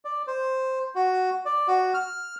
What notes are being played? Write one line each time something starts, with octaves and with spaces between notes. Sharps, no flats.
D5
C5
F#4
D5
F#4
F6